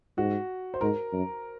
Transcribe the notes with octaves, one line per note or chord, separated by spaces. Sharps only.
G#2 F#4
C5
G#2 A#4
F#2